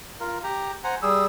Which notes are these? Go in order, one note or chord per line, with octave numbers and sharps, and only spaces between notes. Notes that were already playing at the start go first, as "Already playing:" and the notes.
F4 A#4
G4 A#5
C5 F#5 G#5 A#5
G3 G#4 E6